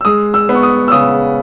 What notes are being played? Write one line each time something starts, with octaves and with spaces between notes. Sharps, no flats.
E6
G#3 D#6
E6
B3
C#6
D#6
E6
C#3 D#6